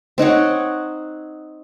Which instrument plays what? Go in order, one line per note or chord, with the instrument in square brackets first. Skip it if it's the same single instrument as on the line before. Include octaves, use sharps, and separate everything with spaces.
[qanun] C4 D#4 C#5 F#5